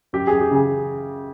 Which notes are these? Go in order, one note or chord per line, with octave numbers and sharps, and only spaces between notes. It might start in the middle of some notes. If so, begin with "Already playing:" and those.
F#2 G4
F#2 G#4
G4
C#3 G#4